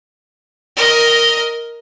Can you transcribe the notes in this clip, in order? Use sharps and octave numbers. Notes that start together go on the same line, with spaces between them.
A#4 D#5